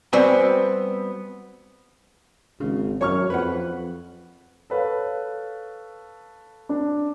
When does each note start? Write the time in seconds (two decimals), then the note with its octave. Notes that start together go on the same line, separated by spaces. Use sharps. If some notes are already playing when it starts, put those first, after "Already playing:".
0.13 G3 B3 C4 F#4 B4 G#5
2.60 G#1 C#3
3.01 F#2 C#5 C#6 F6
3.30 F2 B4 F#5
4.70 A4 B4 C#5 F5
6.69 D4